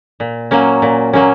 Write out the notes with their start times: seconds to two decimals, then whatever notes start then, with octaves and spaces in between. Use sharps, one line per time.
0.20 A#2
0.51 F#3 A#3 C#4
0.82 A#2
1.13 F#3 A#3 C#4